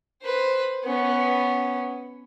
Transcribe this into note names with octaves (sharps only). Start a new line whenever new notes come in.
B4 C5
B3 C#4